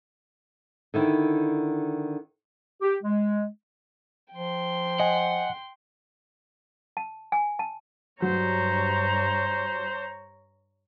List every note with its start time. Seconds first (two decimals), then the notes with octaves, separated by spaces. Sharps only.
0.94 D3 D#3 E4
2.82 G4
3.03 G#3
4.34 F3 G5 C6
5.00 D#5 F#5 G#5
6.97 A5
7.32 G#5
7.59 A5
8.22 G2 F#3 C5 C#5 A#5